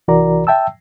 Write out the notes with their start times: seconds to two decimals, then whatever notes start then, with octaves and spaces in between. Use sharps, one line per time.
0.08 C2 E3 F#4 A#4 D5 A#5
0.47 E5 G5 A5 E6